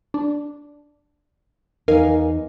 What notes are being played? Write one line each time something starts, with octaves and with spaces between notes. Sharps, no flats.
D4
E2 D#4 A#4 F5 G#5